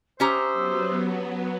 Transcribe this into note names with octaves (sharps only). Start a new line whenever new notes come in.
C#4 G4 C5 E5 A#5 D#6 E6
F#3 B3
A5